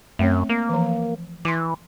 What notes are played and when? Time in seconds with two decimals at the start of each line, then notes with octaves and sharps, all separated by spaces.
0.19 F#2 A3 C4 C#5
0.49 A#3
0.69 E3 F3
1.45 E3 C6 D6